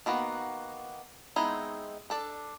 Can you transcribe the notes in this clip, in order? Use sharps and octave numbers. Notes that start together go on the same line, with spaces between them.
D#3 A#3 B3 F#4
G#3 B3 C4 D#4 E4
D4 A4 D5